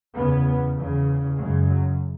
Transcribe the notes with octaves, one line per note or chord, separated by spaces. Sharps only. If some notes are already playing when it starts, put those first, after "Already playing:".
E2 C#3 B3
E2 C#3
F#2 C#3 G#3
F#3